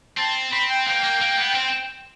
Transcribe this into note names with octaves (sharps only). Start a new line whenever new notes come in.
C4 A5
C4 B5
G5
A#3 G5
A#3
A#3
B3
C4